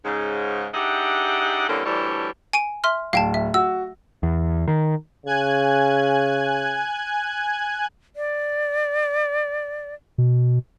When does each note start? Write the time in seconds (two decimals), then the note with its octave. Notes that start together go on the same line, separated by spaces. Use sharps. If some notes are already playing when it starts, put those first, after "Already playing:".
0.05 G#2 C#3
0.74 D4 D#4 G4 G#4 E5 F#5
1.69 D3 E3 G3 A#3 C4 C#4
1.86 D2 E3 G3 D4 A4 C#5
2.53 G#5 D7 D#7
2.84 E5 C6 F6
3.13 D1 F5 G5 A5
3.34 E5
3.54 F#4 E6
4.23 E2
4.68 D#3
5.26 C#3 G#5 F#6 G#6
8.16 D5
10.18 B2